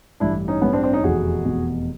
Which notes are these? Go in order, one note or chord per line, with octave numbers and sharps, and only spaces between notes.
A1 G2 E3 D4 E4
C#4 D#4
A1 G2 E3 B3 C#4
C4 D4
C4 D4
C#4 D#4
F1 E2 B2 F#4 G#4
F1 E2 B2